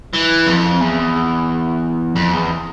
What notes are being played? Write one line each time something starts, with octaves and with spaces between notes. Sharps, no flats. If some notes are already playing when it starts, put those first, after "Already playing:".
E3
F2
E2
F2
E2